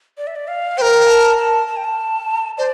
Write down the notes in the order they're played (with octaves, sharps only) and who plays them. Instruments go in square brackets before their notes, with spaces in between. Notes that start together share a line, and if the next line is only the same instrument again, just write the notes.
[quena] D5
E5
D5
F5
[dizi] A#4 C5 [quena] G5
[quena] G5
A5
A5
A5
G5
A5
[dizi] C5 [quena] D5